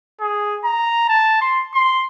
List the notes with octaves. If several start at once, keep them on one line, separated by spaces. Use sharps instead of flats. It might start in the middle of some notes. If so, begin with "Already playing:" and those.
G#4
A#5
A5
C6
C6